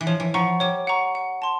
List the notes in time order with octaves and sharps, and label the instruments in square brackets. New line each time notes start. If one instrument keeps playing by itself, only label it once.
[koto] E3
[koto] F3 [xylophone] C#5
[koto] E3
[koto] F3 [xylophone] F#5 A#5 C#6
[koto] G3 [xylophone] C#5
[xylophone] F#5 A#5 C#6
F#5
A5 C6